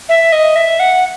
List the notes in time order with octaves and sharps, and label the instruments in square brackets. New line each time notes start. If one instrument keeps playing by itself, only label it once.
[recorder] E5
D#5
E5
F#5